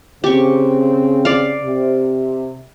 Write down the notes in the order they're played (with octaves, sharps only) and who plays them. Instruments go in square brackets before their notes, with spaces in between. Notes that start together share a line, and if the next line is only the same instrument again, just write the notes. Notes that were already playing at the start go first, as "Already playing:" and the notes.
[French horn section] C#3 C4 [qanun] G4 C#6
[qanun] D5 F5
[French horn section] C3